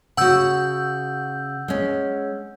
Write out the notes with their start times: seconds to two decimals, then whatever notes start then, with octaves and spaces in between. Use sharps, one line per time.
0.17 C#3 F#4 F#5 E6 G6
1.68 G#3 C#4